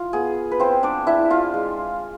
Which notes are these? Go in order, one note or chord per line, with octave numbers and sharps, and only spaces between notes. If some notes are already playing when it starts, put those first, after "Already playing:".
Already playing: F4
B3 G#4
B4
C4 F4 C5
D4 D5
D4 E4 E5
F4 F5
G#3